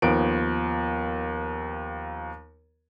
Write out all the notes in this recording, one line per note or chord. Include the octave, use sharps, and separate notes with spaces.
D#2 F3 B3 D7